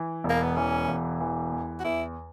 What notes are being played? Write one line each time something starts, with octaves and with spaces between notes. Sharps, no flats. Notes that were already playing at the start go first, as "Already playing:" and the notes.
Already playing: E3
E1
A#3
B3
E3 C#4
E1
E3
E2
F#4
E2 E4